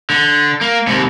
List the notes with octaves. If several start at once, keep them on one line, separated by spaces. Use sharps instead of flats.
D3
A#3
D#2 C3